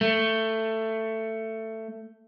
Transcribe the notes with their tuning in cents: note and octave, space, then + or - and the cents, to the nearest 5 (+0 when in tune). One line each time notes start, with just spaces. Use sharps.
A3 +15